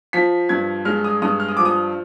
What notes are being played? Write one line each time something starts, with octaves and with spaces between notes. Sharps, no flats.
F3 B6
G2 G#6
G#3 F6
D#6
G2 D#6
F6
D#6
F3 D6
D#6